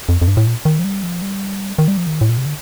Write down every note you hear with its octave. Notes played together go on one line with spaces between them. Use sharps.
F2
F2
G2
A2
A#2
D#3
F3
G3
F3
G3
D#3
G3
F3
D#3
A2
A#2
C3
D3